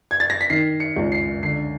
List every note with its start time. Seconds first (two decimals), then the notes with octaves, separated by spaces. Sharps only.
0.11 G#6
0.20 A6
0.30 A#6
0.41 B6
0.50 D#3 C7
0.80 C#7
0.96 C#2
1.12 C7
1.43 D3 C7